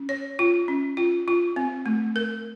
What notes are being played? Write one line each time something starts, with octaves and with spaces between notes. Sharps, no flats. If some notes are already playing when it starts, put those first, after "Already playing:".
Already playing: C#4
C#5
F4
C#4
F4
F4
C4
A3
A#4